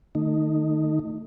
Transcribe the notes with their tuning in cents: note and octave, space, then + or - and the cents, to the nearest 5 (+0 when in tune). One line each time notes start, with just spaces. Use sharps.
D#3 -30 A3 +20 D#4 +0